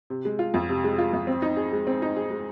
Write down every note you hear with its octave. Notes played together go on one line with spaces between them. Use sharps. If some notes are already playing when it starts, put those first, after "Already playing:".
C3
G#3
F4
F2
C3
G#3
F4
F2
C4
D#4
G#4
G#3
C4
D#4
G#4
G#3